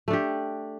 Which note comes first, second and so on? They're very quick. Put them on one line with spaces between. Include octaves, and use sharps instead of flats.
A3 D4 G4